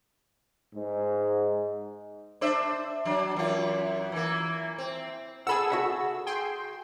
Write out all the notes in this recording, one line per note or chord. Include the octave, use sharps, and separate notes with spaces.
G#2
D4 C5 E5
F#3 D4
F#2 E3 F4
E3 A#3
C4
G#4 A4 F#5 B5 E6
F#4 E5 F#5
G#4 G5 C6